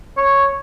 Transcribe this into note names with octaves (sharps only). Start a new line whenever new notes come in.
C#5